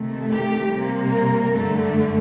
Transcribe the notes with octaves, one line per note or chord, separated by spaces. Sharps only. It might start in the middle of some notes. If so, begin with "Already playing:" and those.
Already playing: C3 D#3 A3
G4
C3 G3 A#3
A#4
G2 D3 A3 A4